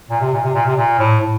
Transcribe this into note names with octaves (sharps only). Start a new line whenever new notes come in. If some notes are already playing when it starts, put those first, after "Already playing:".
A#2
C3
A#2
C3
A#2
C3
A#2
A2
A2